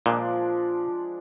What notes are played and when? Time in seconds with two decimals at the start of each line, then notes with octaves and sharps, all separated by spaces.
0.06 A#2 F3 G#3 D4